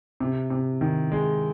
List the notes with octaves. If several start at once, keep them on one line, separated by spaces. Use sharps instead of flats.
C3
C3
D#3
G#3